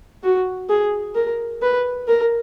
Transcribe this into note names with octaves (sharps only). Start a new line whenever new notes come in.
F#4
G#4
A#4
B4
A#4